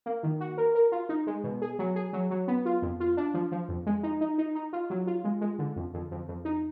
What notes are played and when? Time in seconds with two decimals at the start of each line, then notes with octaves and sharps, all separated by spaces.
0.06 A#3
0.23 D#3
0.40 F#4
0.58 A#4
0.75 A#4
0.92 F4
1.09 D#4
1.27 G#3
1.44 B2
1.62 G#4
1.79 F#3
1.96 G#4
2.13 F#3
2.31 F#3
2.48 B3
2.65 F4
2.82 F2
3.00 F4
3.17 D4
3.34 F3
3.52 F3
3.69 F2
3.86 G#3
4.03 D#4
4.21 D#4
4.38 D#4
4.55 D#4
4.73 F4
4.90 F#3
5.07 F4
5.24 G#3
5.41 G#3
5.59 D3
5.76 F2
5.94 F2
6.11 F2
6.28 F2
6.45 D#4